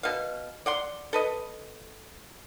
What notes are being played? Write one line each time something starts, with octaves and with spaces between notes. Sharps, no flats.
B2 F5
D5 F#5 C6
A4 B4 D#5